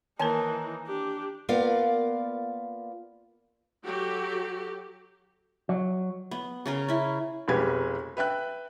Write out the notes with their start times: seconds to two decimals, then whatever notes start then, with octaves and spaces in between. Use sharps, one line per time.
0.19 D#3 E3 A#3 D#4 A#4 G#5 A5
0.87 D4 G4
1.49 A#3 B3 F4 A#4 D5 F5
3.84 F#3 F#4 G4 A4
5.69 F#3
6.31 B3
6.66 C#3 C#4 A#4
6.88 C#4 E4
7.48 F1 B1 G#3 G4 B4 G#6
8.17 B4 E5 G5 F#6